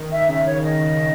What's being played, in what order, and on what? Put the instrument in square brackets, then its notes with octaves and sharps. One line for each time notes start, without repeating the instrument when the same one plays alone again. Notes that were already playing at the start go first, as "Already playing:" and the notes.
Already playing: [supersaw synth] D#3
[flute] E5
[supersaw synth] C#3 [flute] E5
[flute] C#5
[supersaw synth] D#3 [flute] D#5